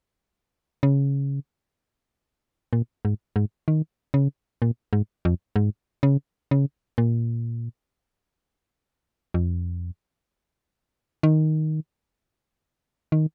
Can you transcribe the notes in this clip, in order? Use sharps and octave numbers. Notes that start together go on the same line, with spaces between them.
C#3
A#2
G#2
G#2
D#3
C#3
A#2
G#2
F2
G#2
C#3
C#3
A#2
F2
D#3
D#3